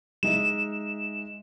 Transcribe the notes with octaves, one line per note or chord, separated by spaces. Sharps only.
G#3 D#4 E5 E7